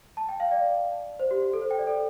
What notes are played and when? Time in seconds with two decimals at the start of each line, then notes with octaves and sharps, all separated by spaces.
0.17 A5
0.29 G5
0.40 F5
0.51 D5
1.19 C5
1.31 G4
1.42 G4
1.54 A4
1.62 C5
1.71 G5
1.79 D5
1.87 A4